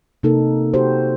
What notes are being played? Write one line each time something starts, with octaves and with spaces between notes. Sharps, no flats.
C3 A#3 D#4 A4 A#4
F#4 G4 C5